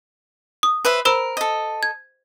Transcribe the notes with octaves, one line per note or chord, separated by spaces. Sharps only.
D#6
B4 C5 E5
A#4 C5 B5 E6
A4 D#5
G#6